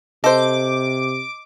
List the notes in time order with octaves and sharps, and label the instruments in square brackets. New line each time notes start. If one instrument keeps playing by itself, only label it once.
[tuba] C3 [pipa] A4 C5 [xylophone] D#5 [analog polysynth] D6